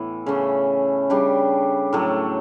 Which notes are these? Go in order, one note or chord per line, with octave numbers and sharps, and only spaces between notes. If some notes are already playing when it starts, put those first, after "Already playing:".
Already playing: A2 E3 B3
C#3 E3 A3 C#4
C#3 G3 D4 G4
A2 F#3 A3